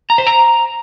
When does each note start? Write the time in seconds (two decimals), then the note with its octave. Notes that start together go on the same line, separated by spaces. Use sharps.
0.10 A#5
0.18 C5
0.27 A#5